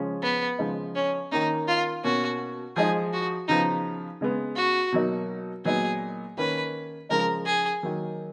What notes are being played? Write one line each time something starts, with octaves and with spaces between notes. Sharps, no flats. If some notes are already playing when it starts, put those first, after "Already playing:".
Already playing: C#3 F3 G#3 C#4
B3
C#3 F3 G#3 D#4
C#4
D#3 A#3 C#4 D#4
F4
B2 A#3 C#4 F#4
F3 G#3 D#4 G#4
F#4
C#3 F3 B3 D#4
C#3 G#3 B3
F#4
B2 F#3 A#3 D#4
A#2 F#3 B3 D#4 G#4
D#3 A#3 C#4 B4
C#3 F3 G#3 D#4 A#4
G#4
D#3 F#3 A#3